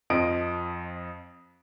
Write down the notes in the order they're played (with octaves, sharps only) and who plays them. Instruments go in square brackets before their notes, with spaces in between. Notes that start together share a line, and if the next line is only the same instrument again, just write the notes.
[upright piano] F2 F3 D#5 D7